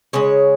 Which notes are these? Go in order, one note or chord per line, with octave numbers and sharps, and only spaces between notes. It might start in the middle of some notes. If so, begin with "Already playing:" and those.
C#3 G#3 C#5